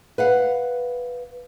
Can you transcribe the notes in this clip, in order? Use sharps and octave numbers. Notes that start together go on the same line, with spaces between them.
B4 F5 F#5